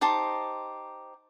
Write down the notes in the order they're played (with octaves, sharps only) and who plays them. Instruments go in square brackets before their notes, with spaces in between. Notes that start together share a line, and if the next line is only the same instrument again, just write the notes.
[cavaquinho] D#4 G4 C5 A5